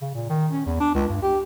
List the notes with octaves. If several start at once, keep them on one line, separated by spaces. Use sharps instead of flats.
C#3
A#2
D#3
C#4
E2
D4
C#2
G2
G4